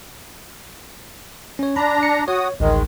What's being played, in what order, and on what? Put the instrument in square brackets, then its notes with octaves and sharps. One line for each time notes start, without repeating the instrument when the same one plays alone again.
[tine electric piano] C#4 C#5
[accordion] D4 A#5 [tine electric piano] B5
[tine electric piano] C#7
[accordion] F#4 D#6 [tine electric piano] C#5
[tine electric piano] A1 D2 [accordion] D#3 G#3